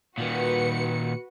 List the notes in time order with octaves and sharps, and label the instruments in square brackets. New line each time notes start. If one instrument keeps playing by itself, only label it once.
[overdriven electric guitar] A#2 D#3 [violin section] F#4 B4 C#7